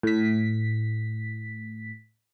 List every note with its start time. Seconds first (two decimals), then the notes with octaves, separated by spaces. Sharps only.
0.03 A2 B6